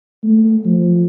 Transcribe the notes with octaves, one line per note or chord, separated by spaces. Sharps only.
A3
F3